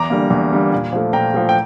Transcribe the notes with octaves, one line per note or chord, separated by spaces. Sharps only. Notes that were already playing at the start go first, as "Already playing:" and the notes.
Already playing: E2 A#5 D6
D3 G3 A#3
E2
D3 G3 A#3
A#2
F3 A3
A#2 G5 A#5
F3 A3
G5